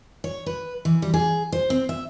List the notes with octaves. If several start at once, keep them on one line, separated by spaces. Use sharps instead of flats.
C#5
B4
E3
G3
G#4
C5
C4
E5